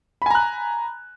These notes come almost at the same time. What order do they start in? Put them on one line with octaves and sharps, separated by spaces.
B5 G#5 A#5 F#6